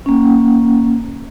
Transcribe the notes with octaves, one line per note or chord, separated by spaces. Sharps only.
A#3 C#4